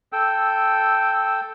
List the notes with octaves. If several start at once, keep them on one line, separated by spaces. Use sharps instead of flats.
A4 G5 E6